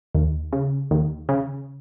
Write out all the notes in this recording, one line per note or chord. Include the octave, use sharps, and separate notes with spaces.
D#2
C#3
D#2
C#3